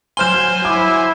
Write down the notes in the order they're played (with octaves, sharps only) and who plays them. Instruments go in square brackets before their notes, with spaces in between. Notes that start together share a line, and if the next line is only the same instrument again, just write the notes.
[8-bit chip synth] F#3 C5 G#5 [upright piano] C6 F6 G6 [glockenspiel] E7 G7
[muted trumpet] E4 [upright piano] D6